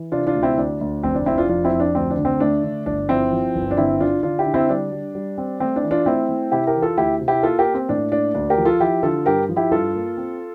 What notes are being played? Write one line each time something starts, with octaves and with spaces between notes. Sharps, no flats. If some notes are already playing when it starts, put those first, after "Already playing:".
Already playing: E3
C3 D4 F4
D4 F4
D2
C4 E4
D2 D4
D2
F1 C4
D4
F1 C4 E4
D4 F4
F2 D4 F4
C4 E4
F2
D4
D2 C4
D4
D3
C4
A3 D4
D3
G1 D4
F3 C4 E4
F3
G1
D4
D3 C4 E4
D3 D4 F4
D3 D4 F4
E4 G4
D3
C4 E4
G3 D4
G3
G3
C4
A3 C4
D4
E3
D4 F4
A3 C4 E4
A3
C3 E4 G4
G4 A#4
E3
F4 A4
D2 E4 G4
C3
E4 G4
A#3 F4 A4
G4 A#4
A#3
C4
A2 D4
A#3 D4
D2 D4
G4 A#4
F3
F4 A4
F3 E4 G4
D3 F4 A4
G2 G4 A#4
F3
E4 G4
G2 F4 A4
A#3
C4